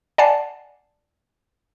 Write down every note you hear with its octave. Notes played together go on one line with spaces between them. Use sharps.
D5 F#5 G#5 A5 C7